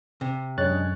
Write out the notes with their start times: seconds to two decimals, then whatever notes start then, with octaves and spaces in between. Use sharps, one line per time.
0.21 C3
0.58 F#2 D3 G#3 C#5 F#6 A6